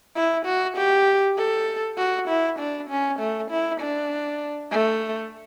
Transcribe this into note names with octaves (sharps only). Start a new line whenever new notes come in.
E4
F#4
G4
A4
F#4
E4
D4
C#4
A3
E4
D4
A3